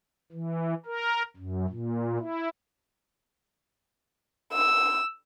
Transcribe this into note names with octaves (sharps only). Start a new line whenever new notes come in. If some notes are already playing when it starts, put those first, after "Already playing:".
E3
A#4
F#2
A#2
E4
E6